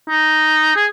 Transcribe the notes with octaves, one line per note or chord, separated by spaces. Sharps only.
D#4
G#4